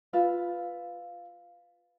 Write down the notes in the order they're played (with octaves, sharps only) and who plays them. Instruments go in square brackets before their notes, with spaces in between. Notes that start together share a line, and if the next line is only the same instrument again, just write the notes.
[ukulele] F4 B4 E5